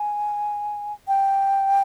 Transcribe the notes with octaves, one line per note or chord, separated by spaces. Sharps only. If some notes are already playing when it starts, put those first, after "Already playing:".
Already playing: G#5
G5